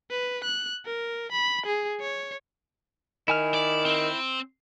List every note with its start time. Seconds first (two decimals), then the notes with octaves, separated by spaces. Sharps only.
0.11 B4
0.44 F#6
0.86 A#4
1.32 B5
1.66 G#4
2.01 C#5
3.28 D#3 E4 G#5 F6
3.54 D5
3.85 C4